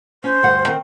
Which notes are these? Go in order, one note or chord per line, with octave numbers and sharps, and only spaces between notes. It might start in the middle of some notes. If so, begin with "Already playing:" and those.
C#4 C5
D2 G2 F#5
D#3 C4